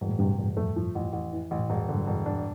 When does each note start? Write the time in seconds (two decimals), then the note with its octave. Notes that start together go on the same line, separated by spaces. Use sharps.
0.01 E1 G2
0.09 A2
0.19 G2 C3
0.38 E1
0.57 F2 A3
0.76 F3
0.95 A1
1.13 A1
1.33 E3
1.51 A1
1.59 A2
1.69 E1 G2
1.89 D3
1.98 G2
2.07 E1
2.26 D4